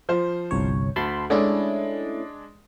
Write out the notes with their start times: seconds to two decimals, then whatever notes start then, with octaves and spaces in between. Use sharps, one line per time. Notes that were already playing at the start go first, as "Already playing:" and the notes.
0.09 F3 C5
0.51 G1 C2 C#5
0.96 D2 A5 B5 C6
1.30 G#3 A3 C#4 D4 E4 D5